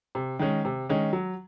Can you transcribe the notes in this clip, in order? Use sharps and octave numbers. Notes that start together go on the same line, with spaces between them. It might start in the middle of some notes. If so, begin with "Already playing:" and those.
C3
D#3 G#3 C#4
C3
D#3 G#3 C#4
F#3